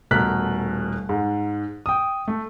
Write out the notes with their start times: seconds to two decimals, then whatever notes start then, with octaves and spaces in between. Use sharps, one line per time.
0.11 D#1 B2 A3 A#4 F#6 B6
1.09 G#2
1.86 G5 D#6
2.28 A3